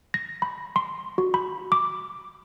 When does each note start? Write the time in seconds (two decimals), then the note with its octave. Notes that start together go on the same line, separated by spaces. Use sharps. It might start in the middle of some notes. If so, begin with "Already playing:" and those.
0.14 A#6
0.42 B5
0.76 C6
1.18 F#4
1.34 B5
1.72 D6